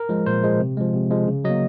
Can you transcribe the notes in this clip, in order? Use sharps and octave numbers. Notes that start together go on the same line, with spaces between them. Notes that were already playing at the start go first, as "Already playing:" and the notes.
Already playing: A#4
F3 G#3
A#2 C5
F3 G#3
C3
F3 G#3
C3
F3 G#3
C#3
F#3 D#5
A#3